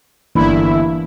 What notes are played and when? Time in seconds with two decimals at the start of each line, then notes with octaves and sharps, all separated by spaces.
0.35 G1 E3 A#3 D4 E4